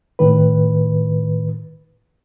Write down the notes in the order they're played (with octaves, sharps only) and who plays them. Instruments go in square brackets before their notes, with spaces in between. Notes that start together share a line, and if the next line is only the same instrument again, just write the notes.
[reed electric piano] A2 D#3 B4